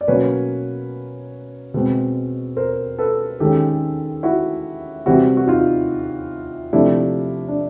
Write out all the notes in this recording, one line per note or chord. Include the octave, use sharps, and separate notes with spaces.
D5
B2 F#3 A#3 C#4 B4 C#5
B2 G#3 C4
A#4 C5
A4 B4
D#3 G#3 C#4 G4 A4
E4 F#4
C3 E3 G3 C4 E4 F#4
F#4
D#4 F4
C3 F3 A3 D4 E4
D4